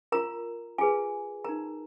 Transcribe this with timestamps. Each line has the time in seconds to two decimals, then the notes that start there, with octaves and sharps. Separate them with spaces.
0.12 F4 A#4 A#5
0.78 F4 G#4 B4 G#5
1.44 D#4 A#4 A#5